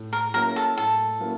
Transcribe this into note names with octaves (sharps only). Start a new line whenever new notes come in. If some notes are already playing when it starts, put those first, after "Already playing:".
Already playing: A2
A#4
F#3 A#3 C#4 E4 A#4
A4
A2 A4
F#3 A#3 C#4 E4